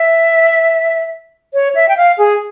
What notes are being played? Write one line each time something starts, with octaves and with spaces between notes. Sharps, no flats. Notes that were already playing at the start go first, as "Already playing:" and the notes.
Already playing: E5
C#5
E5
G5
F5
G#4